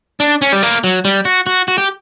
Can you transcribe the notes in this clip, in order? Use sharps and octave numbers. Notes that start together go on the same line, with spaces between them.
D4
C#4
G3
A#3
F#3
G3
F#4
F#4
F#4
G4